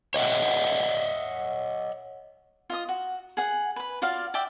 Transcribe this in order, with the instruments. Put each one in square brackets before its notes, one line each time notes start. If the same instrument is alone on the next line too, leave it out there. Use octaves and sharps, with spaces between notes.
[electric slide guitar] C#5 D#5 E5 F#5
[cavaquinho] F4 D#5 D#6
F#4
G#4 F#5
B4 B5
F4 F#4 D5 F5
D5 E5 G5 D6